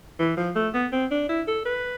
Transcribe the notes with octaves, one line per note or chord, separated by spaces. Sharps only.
E3
F3
A3
B3
C4
D4
E4
A4
B4